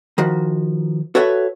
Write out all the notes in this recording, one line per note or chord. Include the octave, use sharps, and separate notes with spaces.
D#3 F3 F#4
F#4 A4 B4 C#5 E5 F#5